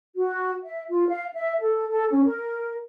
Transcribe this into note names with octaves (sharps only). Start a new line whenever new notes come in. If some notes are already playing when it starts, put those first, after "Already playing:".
F#4
E5
F4
F5
E5
A4
A4
C#4
A#4